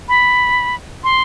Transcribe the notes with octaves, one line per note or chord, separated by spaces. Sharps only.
B5
C6